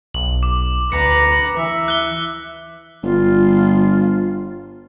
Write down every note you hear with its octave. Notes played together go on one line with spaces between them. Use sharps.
B1 F#7
D6
D2 B4 A#5 C#7
E3 E5
F#6 G7
G1 F4